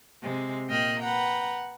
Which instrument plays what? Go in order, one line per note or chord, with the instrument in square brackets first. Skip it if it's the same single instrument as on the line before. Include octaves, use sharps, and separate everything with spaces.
[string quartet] C3 G#3
A#2 D#5 G5 F6 F#6
B4 F#5 G5 A#5